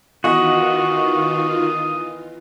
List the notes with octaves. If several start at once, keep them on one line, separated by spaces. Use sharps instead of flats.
D#3 E3 B3 F4 F#4 D#5 D#6